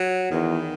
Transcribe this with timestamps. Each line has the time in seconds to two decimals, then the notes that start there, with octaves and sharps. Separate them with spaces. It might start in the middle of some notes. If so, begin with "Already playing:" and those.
Already playing: F#3
0.31 E2 D#3